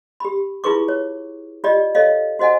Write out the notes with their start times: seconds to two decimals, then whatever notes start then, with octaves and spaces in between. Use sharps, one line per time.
0.20 G4 B5
0.64 E4 F4 G#4 B4 C#6 D6
0.88 C#5
1.64 F4 G4 D5 D#5
1.95 A4 C#5 D#5 F5
2.39 F#4 C5 D#5 F#5 G#5